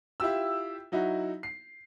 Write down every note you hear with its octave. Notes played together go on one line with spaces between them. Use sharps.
E4 F4 G4 E6
F#3 D#4 E4 F#4
C7